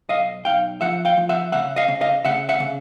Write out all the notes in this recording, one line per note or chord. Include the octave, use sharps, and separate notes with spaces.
B1 D#5 F5
B1 F5 G5
F3 E5 F#5
F5 G5
F3
E5 F#5
C#3 E5 F#5
D#5 F5
C#3
D#5 F5
C#3 E5 F#5
E5 F#5
C#3